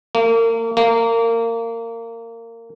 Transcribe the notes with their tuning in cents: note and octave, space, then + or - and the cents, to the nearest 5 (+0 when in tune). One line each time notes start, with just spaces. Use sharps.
A#3 -35
A#3 -25